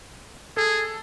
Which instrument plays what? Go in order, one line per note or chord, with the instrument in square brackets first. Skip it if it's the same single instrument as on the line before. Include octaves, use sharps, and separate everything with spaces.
[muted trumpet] G#4 [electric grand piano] A4